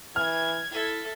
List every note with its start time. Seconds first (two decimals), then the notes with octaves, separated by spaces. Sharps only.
0.16 E3 F6 G#6
0.72 E4 A4 E5